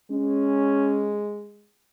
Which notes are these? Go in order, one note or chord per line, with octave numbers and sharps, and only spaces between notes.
G#3 C#4